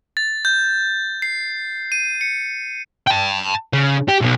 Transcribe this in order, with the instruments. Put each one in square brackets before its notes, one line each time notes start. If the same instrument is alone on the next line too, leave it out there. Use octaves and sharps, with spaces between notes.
[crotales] A6
G6
C7
D#7
C#7
[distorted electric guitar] G5 A5
C#3
G4
B1 B2